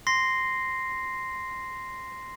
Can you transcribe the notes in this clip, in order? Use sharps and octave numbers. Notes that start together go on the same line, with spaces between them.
C6 A#6 C7